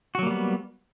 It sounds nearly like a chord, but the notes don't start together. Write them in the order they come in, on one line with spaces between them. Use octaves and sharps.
F#4 F#3 A#3 G3 B3